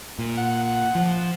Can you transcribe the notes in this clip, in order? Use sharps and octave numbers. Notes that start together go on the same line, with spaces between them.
A#2
F#5
F3